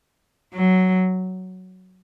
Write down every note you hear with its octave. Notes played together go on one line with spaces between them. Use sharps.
F#3